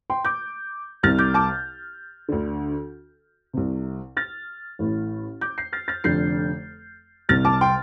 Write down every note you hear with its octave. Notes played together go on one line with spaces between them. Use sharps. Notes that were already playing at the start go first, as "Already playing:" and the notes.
G5 C6
D6 G6
C2 C3 F6 A6
D6 G6
A5 D6
D2 D3
C2 C3
F6 A6
A1 A2
D6 G6
G6 C7
F6 A6
F6 A6
F1 F2 D3 G6 C7
C2 C3 F6 A6
A5 D6
G5 C6